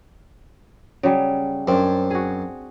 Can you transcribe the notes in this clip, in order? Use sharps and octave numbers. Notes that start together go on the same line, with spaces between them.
C#3 F#3 G3
F#2 C4 D4
F#4 G#4